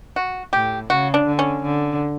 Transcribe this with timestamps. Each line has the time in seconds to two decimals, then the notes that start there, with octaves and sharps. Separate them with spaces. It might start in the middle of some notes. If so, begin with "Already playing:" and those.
0.16 F#4
0.53 A2 G4
0.90 C#3 F#4
1.14 D4
1.26 D3
1.39 C#4
1.63 D3